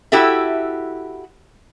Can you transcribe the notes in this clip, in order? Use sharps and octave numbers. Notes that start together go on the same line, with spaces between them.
E4 F#4 G4 A4 E5